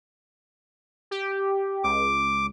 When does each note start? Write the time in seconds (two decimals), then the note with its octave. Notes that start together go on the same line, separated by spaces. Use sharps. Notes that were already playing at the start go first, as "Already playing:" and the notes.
1.11 G4
1.84 C#2 D6